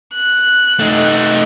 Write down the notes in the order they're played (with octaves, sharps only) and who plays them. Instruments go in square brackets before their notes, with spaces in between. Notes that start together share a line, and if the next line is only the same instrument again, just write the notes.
[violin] F#6
[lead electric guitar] A3 D#4